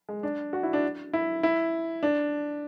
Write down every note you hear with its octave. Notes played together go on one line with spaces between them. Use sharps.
G#3
D4
F#4
E4
D4
E4
E4
D4